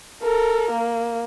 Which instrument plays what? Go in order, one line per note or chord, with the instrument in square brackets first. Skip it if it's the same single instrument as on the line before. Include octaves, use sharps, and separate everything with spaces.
[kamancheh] A4 A#4
A#3